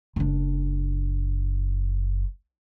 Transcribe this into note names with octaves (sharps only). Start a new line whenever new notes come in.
F#1 D4